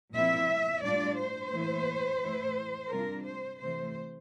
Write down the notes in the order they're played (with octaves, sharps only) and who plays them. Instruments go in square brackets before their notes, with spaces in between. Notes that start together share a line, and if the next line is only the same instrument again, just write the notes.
[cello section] A#2 F3 C4 E4 E5
A2 G3 D4 F4 D5
C5
A2 E3 A#3 E4
A2 E3 A3 E4
C3 G3 D4 F4 A#4
C5
C3 E3 A3 C5